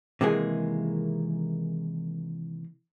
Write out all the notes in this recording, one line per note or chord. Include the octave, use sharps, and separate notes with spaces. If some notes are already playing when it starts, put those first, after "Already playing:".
C3 D#3 E3 G#3 A#3 G#4